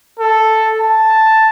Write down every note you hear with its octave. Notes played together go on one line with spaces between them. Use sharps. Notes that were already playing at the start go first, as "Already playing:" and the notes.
A4
A5